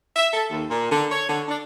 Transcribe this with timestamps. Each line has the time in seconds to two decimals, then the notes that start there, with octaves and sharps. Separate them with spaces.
0.16 E5
0.34 A4
0.50 D#2
0.70 A#2
0.91 D3
1.11 C#5
1.29 D3
1.48 D4